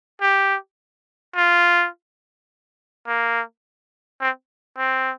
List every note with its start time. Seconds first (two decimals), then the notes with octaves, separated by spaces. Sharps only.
0.21 G4
1.36 F4
3.07 A#3
4.21 C4
4.77 C4